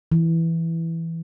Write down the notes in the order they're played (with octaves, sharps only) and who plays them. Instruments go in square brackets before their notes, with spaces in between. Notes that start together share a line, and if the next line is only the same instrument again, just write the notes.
[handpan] E3